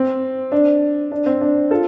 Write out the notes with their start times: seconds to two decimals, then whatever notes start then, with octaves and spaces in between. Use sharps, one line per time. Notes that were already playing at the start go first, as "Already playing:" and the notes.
Already playing: C4
0.52 D4
1.12 D4
1.26 C4
1.41 D4
1.71 F4 A4